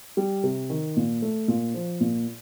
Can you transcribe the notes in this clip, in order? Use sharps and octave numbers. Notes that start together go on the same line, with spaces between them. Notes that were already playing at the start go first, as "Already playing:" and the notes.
G3
C3
D#3
A#2
A3
A#2
F3
A#2